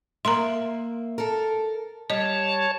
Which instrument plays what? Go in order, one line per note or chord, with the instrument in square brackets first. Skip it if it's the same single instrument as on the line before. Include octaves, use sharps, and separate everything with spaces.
[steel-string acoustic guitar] A#3 E5 [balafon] A#5 C6
[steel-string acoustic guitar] A4 A#4
[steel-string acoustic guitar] G3 [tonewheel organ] C#5 A5 [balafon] D#5